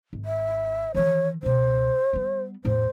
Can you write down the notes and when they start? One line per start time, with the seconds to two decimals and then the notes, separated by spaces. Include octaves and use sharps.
0.13 G#1
0.25 E5
0.94 D#3 E3 C#5
1.43 C#2 B2 C5
2.13 G3 B3
2.65 E2 A2 C5